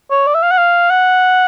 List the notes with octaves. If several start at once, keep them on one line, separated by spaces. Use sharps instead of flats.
C#5
D5
E5
F5
F#5
F5
F#5